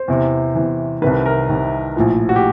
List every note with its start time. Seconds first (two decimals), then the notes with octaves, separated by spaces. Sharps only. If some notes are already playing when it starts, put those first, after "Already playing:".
Already playing: C5
0.08 E2 C3 E3
0.55 E2 C3 E3
1.02 C2 C3 D#3 B4
1.26 A#4
1.49 C2 C3 D#3
1.96 A#1 A2 F3
2.29 F#4
2.36 G4